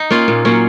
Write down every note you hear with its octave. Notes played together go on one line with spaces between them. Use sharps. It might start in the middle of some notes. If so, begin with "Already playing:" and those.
Already playing: D#4
A#3 C#4 F4
A#2
F#3 A#3 C#4